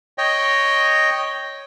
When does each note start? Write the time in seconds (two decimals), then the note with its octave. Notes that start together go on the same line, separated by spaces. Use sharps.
0.18 C#5 D#5 G5